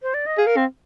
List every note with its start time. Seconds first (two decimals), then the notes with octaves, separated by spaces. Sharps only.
0.03 C5
0.14 D5
0.26 D#5
0.38 G#4 F5
0.47 A#4
0.56 C4